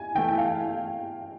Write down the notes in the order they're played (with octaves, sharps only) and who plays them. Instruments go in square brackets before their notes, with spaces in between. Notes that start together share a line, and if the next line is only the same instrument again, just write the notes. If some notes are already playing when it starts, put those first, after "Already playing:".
Already playing: [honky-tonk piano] G#5
[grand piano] E3 A3 [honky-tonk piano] G5
[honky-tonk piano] F5